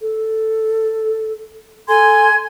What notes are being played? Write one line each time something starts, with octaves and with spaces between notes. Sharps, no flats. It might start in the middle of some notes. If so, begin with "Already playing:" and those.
A4
A4 G#5 C6 G#6